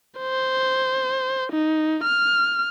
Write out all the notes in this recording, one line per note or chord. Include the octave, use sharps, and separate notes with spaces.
C5
D#4
F6